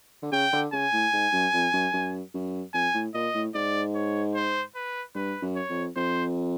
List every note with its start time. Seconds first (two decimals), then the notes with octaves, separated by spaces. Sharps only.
0.23 D3
0.32 C#3 G5
0.52 D3
0.72 C#3 G#5
0.93 A2
1.13 G#2
1.33 F#2
1.53 F2
1.73 F#2
1.93 F#2
2.34 F#2
2.74 F2 G#5
2.94 A2
3.14 A#2 D#5
3.34 A2
3.54 G#2 D5
3.95 C#5
4.35 C5
4.75 B4
5.15 G2 B4
5.42 F#2
5.56 C#5
5.70 F2
5.96 F2 C5